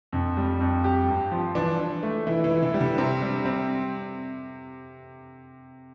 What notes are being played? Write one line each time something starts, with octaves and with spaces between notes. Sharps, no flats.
F2 D3
G3
F2
G4
G2
F3
E3 D4
D4
A3
E3 E4
E3
E4
D3
G3
D3
C3 C4
G3
C4